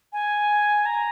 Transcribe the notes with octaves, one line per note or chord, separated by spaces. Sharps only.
G#5
A#5